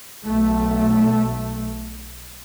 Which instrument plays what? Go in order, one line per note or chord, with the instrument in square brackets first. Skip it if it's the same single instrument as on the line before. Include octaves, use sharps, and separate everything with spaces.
[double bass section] B1 A3